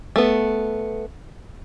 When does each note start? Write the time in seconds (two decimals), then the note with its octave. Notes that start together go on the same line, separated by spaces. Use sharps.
0.16 A3 B3